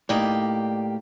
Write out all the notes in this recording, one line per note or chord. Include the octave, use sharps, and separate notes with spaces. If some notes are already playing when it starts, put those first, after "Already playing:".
A2 A#3 D#4 G4 D5